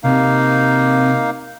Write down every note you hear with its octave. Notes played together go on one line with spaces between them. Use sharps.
C3 A#3 D#4 F5